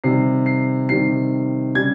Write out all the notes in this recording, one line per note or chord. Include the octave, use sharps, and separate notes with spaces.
C3 D#3 G3 C7
C7
C3 D#3 G3 C7
C#3 G3 G#6